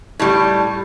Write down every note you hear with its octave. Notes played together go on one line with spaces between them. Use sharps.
A2 G3